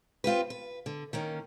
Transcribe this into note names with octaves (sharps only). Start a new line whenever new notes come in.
C4 F4 G4 B4
B4
D3
D#3 A#3 C#4